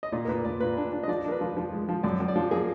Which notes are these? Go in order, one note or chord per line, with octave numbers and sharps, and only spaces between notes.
D#5
A#2 D5
A#4
A#2 B4
A#2 D5
A#2 B4
D4
D4
D#5
F3 D5
D4 A#4
B4
F3
F3
G#3
F3
F#2 D5
F#2
D5
F3
A#3 G#4